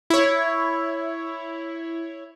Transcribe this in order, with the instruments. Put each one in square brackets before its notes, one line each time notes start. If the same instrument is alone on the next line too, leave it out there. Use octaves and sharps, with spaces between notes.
[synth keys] E4 C#5